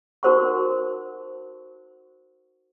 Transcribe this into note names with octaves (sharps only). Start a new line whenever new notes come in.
D#4 F#4 A#4 C5 F#5 C#6